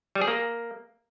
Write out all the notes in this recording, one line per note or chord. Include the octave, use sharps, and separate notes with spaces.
G3
G#4
A#3